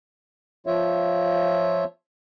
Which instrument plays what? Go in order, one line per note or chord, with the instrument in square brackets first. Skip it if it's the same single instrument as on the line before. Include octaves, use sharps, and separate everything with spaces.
[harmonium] F3 F4 C#5 E5